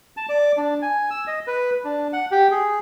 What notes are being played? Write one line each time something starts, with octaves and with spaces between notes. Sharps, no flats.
A5
D5
D4
G#5
E6
D#5
B4
D4
F#5
G4
G#4